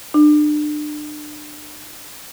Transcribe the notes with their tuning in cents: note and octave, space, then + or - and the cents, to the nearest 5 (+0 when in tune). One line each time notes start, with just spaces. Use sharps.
D4 +35